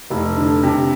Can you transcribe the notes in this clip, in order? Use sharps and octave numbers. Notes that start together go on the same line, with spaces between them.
F1
D3
C3